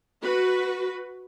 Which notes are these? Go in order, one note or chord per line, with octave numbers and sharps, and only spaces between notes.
F#4 B4